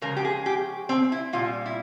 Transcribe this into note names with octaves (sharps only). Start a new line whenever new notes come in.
C#3 F3 G#3 A#4
G4
G#4
G4
C4
E4
A#2 G3 F4
E4